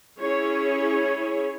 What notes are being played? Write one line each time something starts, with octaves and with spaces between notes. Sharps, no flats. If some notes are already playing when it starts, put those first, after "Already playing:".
C#4 E4 G#4 C#5